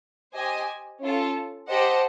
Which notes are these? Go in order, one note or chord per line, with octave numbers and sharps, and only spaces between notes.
G4 C5 D#5 G#5
C#4 F4 A4
G4 C5 D#5 F#5 A5